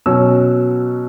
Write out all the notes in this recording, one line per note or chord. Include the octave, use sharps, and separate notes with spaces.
B2 F#3 C#4 E6